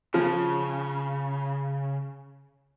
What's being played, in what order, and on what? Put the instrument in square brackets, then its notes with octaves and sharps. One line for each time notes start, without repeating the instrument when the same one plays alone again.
[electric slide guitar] C#3 [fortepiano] F3